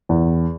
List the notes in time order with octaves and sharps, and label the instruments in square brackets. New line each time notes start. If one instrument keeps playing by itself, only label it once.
[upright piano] E2